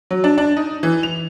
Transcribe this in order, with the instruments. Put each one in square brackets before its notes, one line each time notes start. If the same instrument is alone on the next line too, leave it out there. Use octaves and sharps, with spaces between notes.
[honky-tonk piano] F#3
D4
D4
D#4
E3
F7